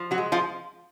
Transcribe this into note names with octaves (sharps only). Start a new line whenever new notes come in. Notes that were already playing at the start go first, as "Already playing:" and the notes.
Already playing: F3
F#3 F#4
G#3
F3 F4